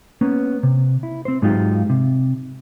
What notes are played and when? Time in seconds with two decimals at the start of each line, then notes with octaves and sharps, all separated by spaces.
0.21 A#3 B3 C#4
0.63 C3
1.03 E4
1.25 C4 C5
1.42 G#2 F#3 G#3 D#4 F4 G4
1.90 C3